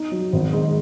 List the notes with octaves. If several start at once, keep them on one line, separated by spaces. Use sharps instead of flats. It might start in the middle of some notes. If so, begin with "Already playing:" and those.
Already playing: D#4
F#3
G#1
G#2